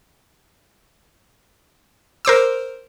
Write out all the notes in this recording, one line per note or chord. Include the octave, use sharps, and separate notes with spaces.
A#4 C5 D6 E6